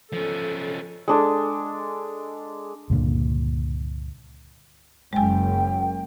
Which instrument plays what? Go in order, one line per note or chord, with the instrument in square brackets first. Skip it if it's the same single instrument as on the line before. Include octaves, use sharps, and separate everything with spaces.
[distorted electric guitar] F3 C#4 [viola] A4
[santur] G#3 D4 A4
[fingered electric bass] C#2 G2 A#2 D3
[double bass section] F#1 F#2 [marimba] G#3 G#5 [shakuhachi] G5